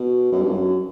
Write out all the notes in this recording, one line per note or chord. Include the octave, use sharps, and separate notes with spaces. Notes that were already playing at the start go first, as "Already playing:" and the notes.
Already playing: B2
F#2
G2
F#2